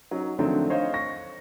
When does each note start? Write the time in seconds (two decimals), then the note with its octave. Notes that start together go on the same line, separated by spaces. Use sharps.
0.11 F#3 C#4 D#4
0.39 D3 D#3 F3 F#3 A3 C4
0.70 C5 C#5 D#5 F5
0.94 C#6 A#6